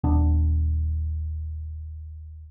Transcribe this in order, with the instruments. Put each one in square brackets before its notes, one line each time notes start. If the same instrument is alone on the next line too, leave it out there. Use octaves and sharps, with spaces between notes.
[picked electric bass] D#1 B3 D4